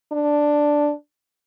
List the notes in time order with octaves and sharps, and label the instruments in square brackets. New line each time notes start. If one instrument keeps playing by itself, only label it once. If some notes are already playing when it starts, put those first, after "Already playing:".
[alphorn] D4